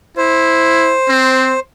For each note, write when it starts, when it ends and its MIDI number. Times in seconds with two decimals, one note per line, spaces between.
0.17 0.95 64
0.17 1.60 72
1.08 1.55 60